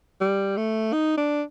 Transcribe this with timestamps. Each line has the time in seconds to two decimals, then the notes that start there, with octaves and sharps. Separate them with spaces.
0.21 G3
0.57 A3
0.93 D#4
1.17 D4